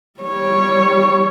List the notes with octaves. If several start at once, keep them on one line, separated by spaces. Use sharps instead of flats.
G3 C#5